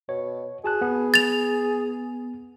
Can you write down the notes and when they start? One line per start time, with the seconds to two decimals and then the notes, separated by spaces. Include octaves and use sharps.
0.09 B2 C#5
0.64 F#4 G#4 A5 F#6
0.81 B3
1.14 A6 F7